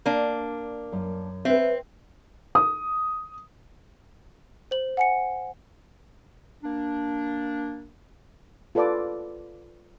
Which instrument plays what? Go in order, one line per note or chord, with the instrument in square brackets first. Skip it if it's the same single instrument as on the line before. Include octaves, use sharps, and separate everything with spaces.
[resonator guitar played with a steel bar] A#3 D4
[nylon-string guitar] F#2
[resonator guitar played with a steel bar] C4 [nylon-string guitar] B4 E5
[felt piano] D#6
[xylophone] C5 F#7
F#5 G#5 C#7
[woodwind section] A#3 D4
[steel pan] F4 A4 B4 D5 A5 D6